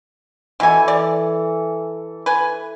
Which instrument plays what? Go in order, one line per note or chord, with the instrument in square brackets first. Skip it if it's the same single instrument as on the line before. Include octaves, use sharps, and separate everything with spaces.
[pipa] B2 G#5 [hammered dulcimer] E3 A4
[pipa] D5
B4 G#5